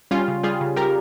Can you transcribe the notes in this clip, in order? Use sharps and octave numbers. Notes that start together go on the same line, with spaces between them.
G3 C#4 F4
C#3
G3 F4 G#4
C#3
G3 G4 A#4